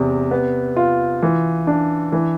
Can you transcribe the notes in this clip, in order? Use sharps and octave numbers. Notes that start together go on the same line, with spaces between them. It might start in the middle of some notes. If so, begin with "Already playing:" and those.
Already playing: E2 C3
B3
F4
E3
D4
E3